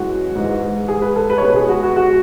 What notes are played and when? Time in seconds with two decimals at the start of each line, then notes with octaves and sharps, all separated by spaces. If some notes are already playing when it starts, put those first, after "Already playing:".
Already playing: F#2 E3 G#3 F#4
0.35 G#2 E3 G#3
0.88 G#4
1.02 B4
1.16 A4
1.30 B4
1.38 C#5
1.42 B2 G#3 B4
1.56 G#4
1.69 F#4
1.83 F#4
1.96 F#4